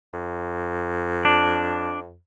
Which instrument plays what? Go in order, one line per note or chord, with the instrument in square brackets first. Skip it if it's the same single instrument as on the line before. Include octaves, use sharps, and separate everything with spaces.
[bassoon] F2
[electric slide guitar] D4